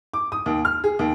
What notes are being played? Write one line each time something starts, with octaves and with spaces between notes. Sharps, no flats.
D6
D#6
D#2
F6
G#4
D#2